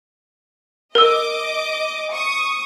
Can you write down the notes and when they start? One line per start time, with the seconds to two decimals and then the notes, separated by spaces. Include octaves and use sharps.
0.95 A#4 D#5 D6 E6
2.12 C#6 D#6